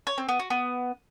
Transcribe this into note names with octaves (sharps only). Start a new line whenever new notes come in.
C#5
C4
B3
F#4
B3